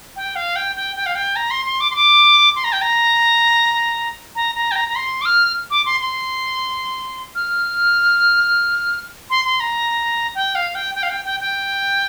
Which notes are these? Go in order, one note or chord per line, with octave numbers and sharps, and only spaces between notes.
G5
F5
G5
G5
G5
F5
G5
A#5
C6
C6
D6
C6
D6
C6
A#5
G5
A#5
A#5
A#5
G5
A#5
A#5
C6
D6
F6
D6
C6
C6
F6
C6
C6
A#5
G5
F5
G5
G5
F5
G5
G5
G5